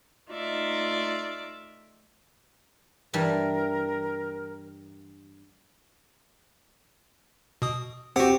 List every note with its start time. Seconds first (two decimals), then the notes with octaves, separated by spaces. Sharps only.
0.30 A3 D#4 F4 D5 E5
3.13 G2 E3 G3 A#4
7.62 B2 D#6
8.16 C4 F#4 G4 F#5